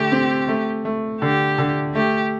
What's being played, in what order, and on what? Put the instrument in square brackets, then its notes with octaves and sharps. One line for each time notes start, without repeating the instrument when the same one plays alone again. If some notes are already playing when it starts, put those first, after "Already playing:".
Already playing: [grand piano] D3 A3 [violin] G4
[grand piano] C4
A3
A3
[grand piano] D3 [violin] G4
[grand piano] D3
[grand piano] A3 [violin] G4